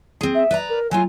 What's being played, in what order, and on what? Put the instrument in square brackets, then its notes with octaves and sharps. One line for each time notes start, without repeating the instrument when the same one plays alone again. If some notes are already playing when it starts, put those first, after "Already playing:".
[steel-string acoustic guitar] C4 G#4
[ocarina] E5
[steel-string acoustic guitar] B4 D5 A#5
[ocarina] A#4
[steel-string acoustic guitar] F#3 A3 F4 [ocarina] G#5